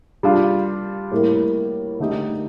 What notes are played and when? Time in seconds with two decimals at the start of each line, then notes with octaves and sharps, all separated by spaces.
0.23 G3 D4 F4
1.11 A2 G3 A#3
2.00 D3 A3 D#4 G4